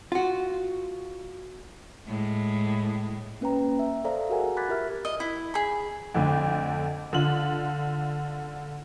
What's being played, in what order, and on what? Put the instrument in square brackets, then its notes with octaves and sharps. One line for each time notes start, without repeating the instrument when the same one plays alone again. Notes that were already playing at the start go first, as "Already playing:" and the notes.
[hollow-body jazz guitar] F4 F#4
[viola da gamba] A2 G#3
[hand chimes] A#3 C#4 B4 G5 A#5
E5
A4 C5 D5 E5 F5 A#5
F#4 G#4 A#4 F#5 G#5
B5 D6 F#6 G#6 A6 B6
F4 G4 A#4 E5 F6
[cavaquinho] D#5
E4
G#4 B5
[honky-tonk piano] F2 D3 A3
D3 F4 F#7